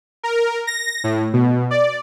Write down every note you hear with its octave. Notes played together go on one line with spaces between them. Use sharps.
A#4
A#6
A2
B2
D5